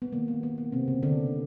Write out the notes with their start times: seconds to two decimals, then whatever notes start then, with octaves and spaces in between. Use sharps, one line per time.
0.02 B3
0.12 D#3 G#3 A#3
0.28 B3
0.43 B3
0.58 B3
0.72 C3 C4
0.88 C#3 C#4
1.03 D3 D4